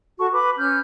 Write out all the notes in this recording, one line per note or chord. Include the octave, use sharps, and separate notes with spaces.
F#4 A4 A5 C#6
B4 B5 D6
C#4 F6 G6